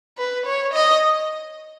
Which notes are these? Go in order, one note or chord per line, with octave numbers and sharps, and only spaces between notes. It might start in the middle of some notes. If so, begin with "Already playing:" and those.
B4
C#5
D#5